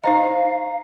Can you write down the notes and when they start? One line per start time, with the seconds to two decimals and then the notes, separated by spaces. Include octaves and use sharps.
0.04 D#4 C5 D#5 F5 A#5